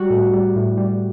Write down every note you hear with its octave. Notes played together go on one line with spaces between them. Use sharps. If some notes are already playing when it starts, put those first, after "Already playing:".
Already playing: G3 F#4
A2
G3
A2
G3